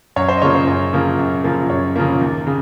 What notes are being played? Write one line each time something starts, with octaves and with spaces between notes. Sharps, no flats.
F#2 C#5
C5
D#5
C#3 F3 A#3 C#5
C5
F#2
C#3 F3 A#3
F#2
C#3 F3 A#3
F#2 C#5
C#3 F3 A#3
D#2
C#3